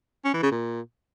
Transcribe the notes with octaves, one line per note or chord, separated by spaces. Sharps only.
C#4
E3
C#3
A#2